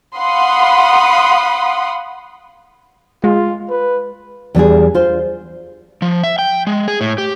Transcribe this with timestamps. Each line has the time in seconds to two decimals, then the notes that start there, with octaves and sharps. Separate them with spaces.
0.17 F5 F#5 B5 C6 D#6
3.24 G#3 F4
3.70 B4
4.55 E2 G3 D4 G#4
4.94 F4 C5
6.02 F3
6.24 E5
6.39 G5
6.67 G#3
6.88 G#4
7.01 A2
7.18 G4